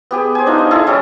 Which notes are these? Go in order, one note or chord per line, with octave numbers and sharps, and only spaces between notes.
B3 G4 G#4
C5 G#5
D4 D#4 F4
D#5
E4 G#4 A4
G3 C#4 A4